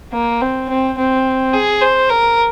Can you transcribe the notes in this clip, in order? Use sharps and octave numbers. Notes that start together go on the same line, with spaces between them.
A#3
C4
C4
C4
G#4
C5
A#4